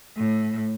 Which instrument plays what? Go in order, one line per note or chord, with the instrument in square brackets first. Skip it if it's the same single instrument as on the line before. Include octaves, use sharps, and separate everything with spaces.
[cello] A2